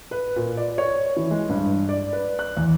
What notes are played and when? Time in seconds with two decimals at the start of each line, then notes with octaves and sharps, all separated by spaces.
0.11 B4
0.36 A#2
0.57 D5
0.78 C#5
1.17 E3
1.31 G#3
1.49 G2
1.89 D5
2.13 B4
2.39 F#6
2.57 E2